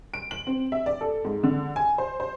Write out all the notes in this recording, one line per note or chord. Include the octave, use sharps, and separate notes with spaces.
D7
F#7
C4
E5
D5
A4
G#2
D3
G#5
C5
C5